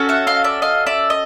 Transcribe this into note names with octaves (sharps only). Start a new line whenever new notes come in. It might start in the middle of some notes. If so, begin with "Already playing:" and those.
Already playing: C#4 F#4 A4
E5 F#5
D#5 F5
D5 E5
D#5 F5
D5 E5
D#5